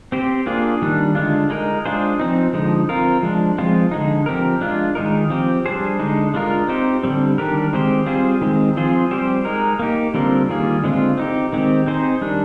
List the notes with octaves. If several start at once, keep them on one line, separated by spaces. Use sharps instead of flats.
C4 G4 C5
A#3 D4 F4 G#4
D#3 G3 D4
D3 G#3 D4 F4
G#3 D#4 A#4
G#3 D4 F4 G#4 C5
F3 C4 D#4
D3 F3 G#3 D#4
C4 F4 A#4
F3 G#3 D4
F3 G#3 C4 F4
D3 G#3 D#4
F3 C4 G4 A#4
G#3 D4 F4
D#3 G#3 D#4 A#4
F3 C4 G4
G3 D4 G#4 C5
D3 G#3 D#4
G#3 D4 F4 A#4
C4 D#4 G4 C5
D3 G3 C4
D#3 G3 D4 G4 A#4
D#3 G#3 C4 G4 C5
G3 C4 F4 G#4 C5
D#3 G#3 C4
F3 C4 F4 G#4 C5
G3 C4 G4 C5
G#3 D#4 A#4
A#3 D#4 G4
D3 G3 C4 F4 A#4
D#3 G3 A#3 F4 G#4
D3 G#3 C4 F4
C4 D#4 G4
D#3 G#3 C4 G4
C4 D#4 G#4 C5
D#3 G3 D4